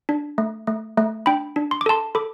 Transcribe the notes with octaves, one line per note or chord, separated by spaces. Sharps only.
D4
A3
A3
A3
D4 G5 B5
D4
C6
D6
A4 A5 C6
A4 B5 D6